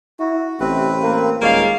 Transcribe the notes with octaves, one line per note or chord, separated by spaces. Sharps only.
E4 F#4
A1 C3 C4 B4
A#3
D#1 G#3 A#3 A#4 C#5 D5 F5